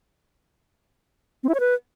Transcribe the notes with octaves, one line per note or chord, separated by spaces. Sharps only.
C4
E4
C#5
B4